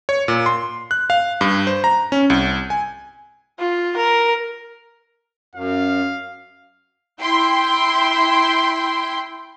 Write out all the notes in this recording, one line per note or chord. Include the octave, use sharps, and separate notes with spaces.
C#5
A#2
C6
F#6
F5
G2
C5
A#5
C#4
C2
G#5
F4
A#4
F#2 F5
E4 G5 C6